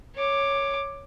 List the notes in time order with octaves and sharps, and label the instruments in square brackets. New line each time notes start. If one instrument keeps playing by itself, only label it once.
[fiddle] C#5 D6